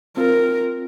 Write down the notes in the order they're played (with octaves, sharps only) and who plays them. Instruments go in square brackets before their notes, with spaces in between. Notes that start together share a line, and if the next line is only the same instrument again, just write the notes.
[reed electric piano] C4 F4 [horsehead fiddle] A#4